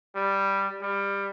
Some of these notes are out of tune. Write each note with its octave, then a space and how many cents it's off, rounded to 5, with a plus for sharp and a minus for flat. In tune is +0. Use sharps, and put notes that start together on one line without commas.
G3 +0
G3 +20